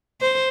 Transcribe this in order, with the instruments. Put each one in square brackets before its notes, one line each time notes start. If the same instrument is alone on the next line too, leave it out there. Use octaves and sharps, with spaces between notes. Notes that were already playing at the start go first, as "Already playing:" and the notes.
[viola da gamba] C5